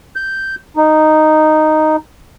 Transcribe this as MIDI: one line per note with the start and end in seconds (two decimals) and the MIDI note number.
0.16 0.55 91
0.77 1.96 63